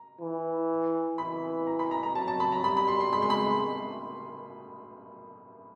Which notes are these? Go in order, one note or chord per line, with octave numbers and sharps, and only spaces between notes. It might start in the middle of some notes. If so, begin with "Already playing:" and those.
Already playing: A#5
E3
E3 B5
A#5
B5
A#5
A#5
F#3 A5
A5
B5
A#5
G3 B5
B5
C6
C6
G#3 B5
C6
B5